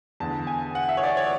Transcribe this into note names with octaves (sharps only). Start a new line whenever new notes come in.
E2 D3 A5
G#5
F#5
E5
C#5
D5
C#5